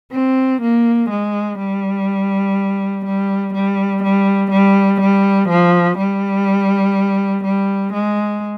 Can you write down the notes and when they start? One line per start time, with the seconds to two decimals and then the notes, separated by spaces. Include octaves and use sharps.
0.12 C4
0.62 A#3
1.10 G#3
1.58 G3
3.06 G3
3.54 G3
4.03 G3
4.51 G3
5.01 G3
5.49 F3
5.98 G3
7.45 G3
7.94 G#3